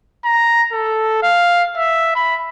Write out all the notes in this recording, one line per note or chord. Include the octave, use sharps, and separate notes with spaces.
A#5
A4
F5
E5
B5